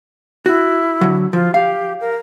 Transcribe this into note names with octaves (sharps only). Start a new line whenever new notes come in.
E4 F#4
D3 F#3
F3 F4
G4 F5
A#4